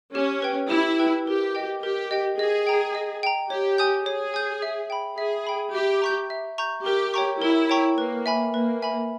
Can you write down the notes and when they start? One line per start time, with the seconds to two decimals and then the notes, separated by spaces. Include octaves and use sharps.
0.15 C#4 G4
0.42 B4 G5
0.70 E4 G4
0.99 B4 G5
1.26 G4 A#4
1.55 D#5 G5
1.83 G4 A#4
2.11 D#5 G5
2.39 G#4 D#5
2.67 G5 A#5
2.95 D#5
3.23 G5 A#5
3.50 G4 C#5
3.78 G#5 D#6 G6
4.06 G#4 C#5
4.34 G#5 D#6 G6
4.62 E5
4.90 G5 B5
5.18 G#4 E5
5.47 G5 B5
5.74 G4 E5
6.02 A#5 C#6 G6
6.30 E5
6.58 A#5 C#6 G6
6.86 G4 A#4
7.14 C#5 G5 A#5 C#6
7.42 E4 A#4
7.69 C#5 G5 A#5 C#6
7.98 A#3 B4
8.26 E5 G#5 B5
8.54 A#3 B4
8.82 E5 G#5 B5